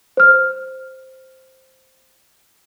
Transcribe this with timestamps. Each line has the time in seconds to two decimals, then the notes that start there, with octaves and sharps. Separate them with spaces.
0.17 C5 F6